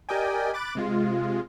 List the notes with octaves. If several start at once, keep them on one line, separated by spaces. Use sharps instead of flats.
G4 A#4 D5 D#5 G5 G#5
B5 D6 F#6 A6 D7
C3 G#3 F4